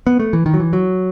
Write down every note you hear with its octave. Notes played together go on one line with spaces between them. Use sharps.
B3
A3
E3
D#3
F#3
E3
F#3